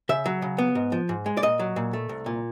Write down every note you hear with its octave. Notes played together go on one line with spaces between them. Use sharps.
C#3 E5
F#3
C#3
B3
G#2
F3
G#2
G#3
D5
A#2 D#5
F#3
A#2
A3
C2
A#2